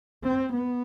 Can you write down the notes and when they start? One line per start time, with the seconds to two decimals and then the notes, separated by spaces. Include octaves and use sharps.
0.23 C4
0.54 B3